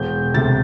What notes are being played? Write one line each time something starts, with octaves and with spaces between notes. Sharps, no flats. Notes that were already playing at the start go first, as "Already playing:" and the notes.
Already playing: E1 G6
D2 C3 A6